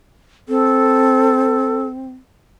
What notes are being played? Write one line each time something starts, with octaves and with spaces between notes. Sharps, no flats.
C4 A4